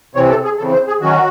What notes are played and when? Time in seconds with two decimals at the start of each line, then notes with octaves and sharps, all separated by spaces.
0.15 C3 E3 C4 C#5
0.30 A4
0.44 G#4
0.58 C#3 E3 C4 A4
0.73 C5
0.87 G#4
1.01 D#3 F#3 C#4 F#4